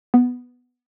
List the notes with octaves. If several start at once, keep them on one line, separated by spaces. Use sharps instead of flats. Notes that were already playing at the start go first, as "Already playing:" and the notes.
B3